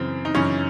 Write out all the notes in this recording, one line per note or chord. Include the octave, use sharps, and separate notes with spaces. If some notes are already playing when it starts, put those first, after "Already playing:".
Already playing: F#2 C#3 E3 C4
D#4
F#2 C#3 E3 C#4